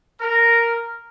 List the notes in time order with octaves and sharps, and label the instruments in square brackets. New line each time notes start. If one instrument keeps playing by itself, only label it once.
[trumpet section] A#4